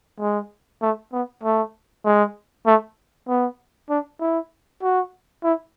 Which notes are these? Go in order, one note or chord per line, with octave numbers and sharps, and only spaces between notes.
G#3
A3
B3
A3
G#3
A3
B3
D4
E4
F#4
E4